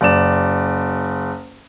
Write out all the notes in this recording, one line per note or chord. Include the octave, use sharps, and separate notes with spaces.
F#1 D5 E7